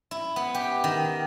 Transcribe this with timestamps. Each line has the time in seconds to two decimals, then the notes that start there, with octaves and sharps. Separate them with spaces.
0.11 E4
0.36 B3
0.54 G4
0.84 D#3